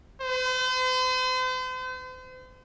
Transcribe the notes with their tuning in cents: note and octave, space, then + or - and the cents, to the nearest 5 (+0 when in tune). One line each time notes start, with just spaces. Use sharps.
C5 -40